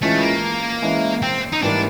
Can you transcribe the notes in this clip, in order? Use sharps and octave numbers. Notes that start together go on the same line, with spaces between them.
E3 G#3 A3 C#4 F4
B3
A#3
E3 G#3 C#4 E4
C4
D#4
G#2 E3 G3 A#3 D4